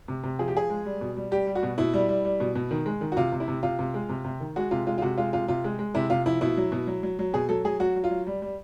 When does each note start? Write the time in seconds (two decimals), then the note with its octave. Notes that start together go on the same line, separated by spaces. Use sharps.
0.08 C3
0.23 C3
0.39 F3 G#4
0.48 G4
0.54 F3 G#4
0.70 G#3
0.85 G3
1.01 B2
1.17 G3
1.31 G3 G4
1.47 G3
1.55 F#4
1.63 B2
1.78 B2 E4
1.94 G3
2.09 G3
2.25 G3
2.40 B2
2.55 B2
2.71 D#3
2.86 G#3
3.01 D#3
3.12 F#4
3.17 C3 F4
3.32 C3
3.40 E4
3.48 C3
3.63 C3 F4
3.79 C3
3.94 G#3
4.09 C3
4.25 C3
4.40 D#3
4.56 G#3 F#4
4.71 C3 F4
4.87 G#3 F4
4.98 F4
5.02 C3 F#4
5.18 G#3 F4
5.33 C3 F4
5.48 C3 F4
5.64 G#3
5.79 G#3
5.95 C3 E4
6.10 C3 F4
6.26 F3 E4
6.41 B2 E4
6.57 F#3
6.72 B2
6.87 F#3
7.03 F#3
7.19 F#3
7.33 B2 G#4
7.49 F#3 A4
7.65 F#3 G#4
7.80 F#3 F#4
7.96 F#3
8.04 F4
8.10 F#3
8.27 G3
8.42 G3